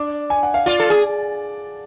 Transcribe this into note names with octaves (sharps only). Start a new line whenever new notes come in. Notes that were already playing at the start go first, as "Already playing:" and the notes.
Already playing: D4
G#5
F#5
F5
F4 D5
A4
G#4